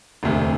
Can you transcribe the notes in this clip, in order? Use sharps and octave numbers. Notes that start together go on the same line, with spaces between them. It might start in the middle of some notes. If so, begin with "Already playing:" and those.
E1 D2 C3